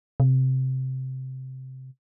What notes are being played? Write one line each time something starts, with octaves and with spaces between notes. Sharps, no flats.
C3